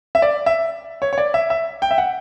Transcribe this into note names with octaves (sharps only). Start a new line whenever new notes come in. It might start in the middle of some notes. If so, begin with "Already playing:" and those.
E5
D5
E5
C#5
C#5
D5
E5
E5
G5
E5
F#5